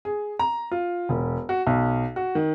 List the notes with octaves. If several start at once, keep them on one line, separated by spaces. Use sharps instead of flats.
G#4
A#5
F4
E1
F#4
B1
F#4
D#3